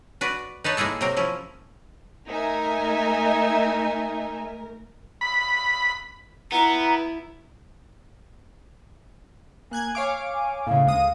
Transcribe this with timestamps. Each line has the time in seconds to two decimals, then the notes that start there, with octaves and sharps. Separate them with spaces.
0.21 F#4 B4 D5
0.64 D#4 B4 C#5 A5
0.77 G#3 A#3 E4 G#4 A4
1.01 C3 F#3 C4 A#4
1.17 F3 C#4 E4
2.28 A3 D#4 A#4 E5 G#5
5.21 B5
6.52 B3 E4 A#5
9.71 A#3 G#5 F#6 G#6
9.95 C#5 F5 D6
10.33 G#5
10.67 A2 C#3 F5
10.86 D2 G#3 D#6